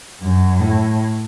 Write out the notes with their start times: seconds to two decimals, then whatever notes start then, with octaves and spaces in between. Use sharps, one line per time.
0.21 F#2
0.60 A2